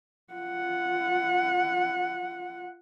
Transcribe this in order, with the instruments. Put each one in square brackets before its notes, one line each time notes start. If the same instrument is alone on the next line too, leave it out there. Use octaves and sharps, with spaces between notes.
[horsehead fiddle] F4 F#5